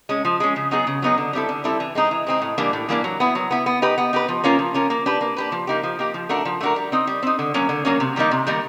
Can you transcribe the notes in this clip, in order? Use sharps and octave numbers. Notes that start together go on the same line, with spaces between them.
G#3 C#4
F3
G#3 C#4
C#3
F#3 B3 D#4 G#4
C#3
F#3 B3 D#4 G#4
D3
G3 C4 E4 A4
D3
G3 C4 E4 A4
E3
G#3 C4 D#4
E3
G#3 C4 D#4
A2
E3 G3 A#3 D4
A2
E3 G3 A#3 D4
F#3
B3 E4
F#3
B3 E4
B3
D#4 G4 B4
B3
D#4 G4 B4
F3
A#3 C#4 F4 A#4
F3
A#3 C#4 F4 A#4
A#3
D4 G4 B4
A#3
D4 G4 B4
F3
A#3 D#4 G4
F3
A#3 D#4 G4
F3
A3 D4 F#4 A#4
F3
A3 D4 F#4 A#4
G3
C4 D#4
G3
C4 D#4
D3
F#3 A#3 C#4
D3
F#3 A#3 C#4
C3
D#3 G3 A#3 D#4
C3
D#3 G3 A#3 D#4